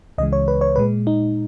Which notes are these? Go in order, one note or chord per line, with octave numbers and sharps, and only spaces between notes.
C#2 C#3 E3 G#3 D#5
C#5
B4
C#5
A#2 G#3 B4
D#4